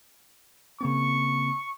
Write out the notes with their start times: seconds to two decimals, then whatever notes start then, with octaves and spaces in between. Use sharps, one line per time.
0.81 C#3 A#3 C4 C#6